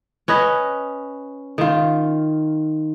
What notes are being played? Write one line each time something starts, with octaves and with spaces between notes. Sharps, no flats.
C#4 B4 D#5
D#3 F4